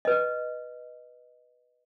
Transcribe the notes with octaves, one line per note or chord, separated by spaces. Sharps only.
B4 D#5